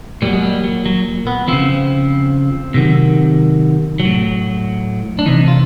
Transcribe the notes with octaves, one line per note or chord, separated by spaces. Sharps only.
A#2 F#3 G3
G#3
G3
F#3
F#3
B3
C#3 F3 C4
C3 D#3 F#3
F#3
A2
D4
C3 E3 D#4
F4